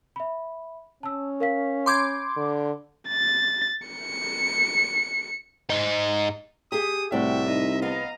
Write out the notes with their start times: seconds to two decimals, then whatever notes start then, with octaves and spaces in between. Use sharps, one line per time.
0.16 E5 B5
1.03 C#4 A5 E6
1.40 A#4 F5 B6
1.86 B5 C6 D6 G6 G#6
2.36 D3
3.09 A6
3.88 C#7
5.70 G#2 D#4
6.72 G4 G#4 D#6
7.12 C2 A2 F#4 D5 E5 G5
7.46 D#4 D#5
7.82 B3 D#5 F5 A#5